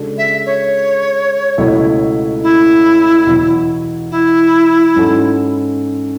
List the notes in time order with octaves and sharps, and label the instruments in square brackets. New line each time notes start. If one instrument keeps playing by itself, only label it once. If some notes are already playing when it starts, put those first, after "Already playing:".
Already playing: [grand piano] C#3 G#3 D4 F#4 A4
[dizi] E5
C#5
[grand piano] C#2 B2 F#3 A3 E4
[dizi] E4
[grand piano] E2 B2 F#3
[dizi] E4
[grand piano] G#2 F#3 C#4 F#4 A4